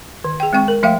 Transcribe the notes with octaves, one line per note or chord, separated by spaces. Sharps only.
D#3
G#4 G5
G#3 C4 G5 C#6
A#4
F3 A3 E5 F5 G5